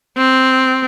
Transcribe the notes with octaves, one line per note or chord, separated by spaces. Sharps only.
C4